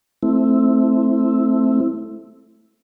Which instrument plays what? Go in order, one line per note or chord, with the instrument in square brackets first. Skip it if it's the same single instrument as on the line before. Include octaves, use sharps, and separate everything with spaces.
[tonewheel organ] A3 C4 E4